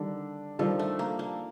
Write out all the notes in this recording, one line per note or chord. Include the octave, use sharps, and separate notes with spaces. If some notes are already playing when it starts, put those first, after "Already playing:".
Already playing: D3 D#3 G3 D4 A4
D#3 F3 G3 D4 A4
A3
A#3
A#3